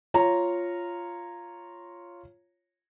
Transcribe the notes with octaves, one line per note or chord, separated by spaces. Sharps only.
F4 C#5 A#5